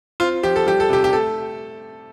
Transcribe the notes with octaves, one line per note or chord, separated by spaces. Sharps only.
C4 F4
F3 G4
A4
G3 G4
A4
C3 G4
G4
A3 A4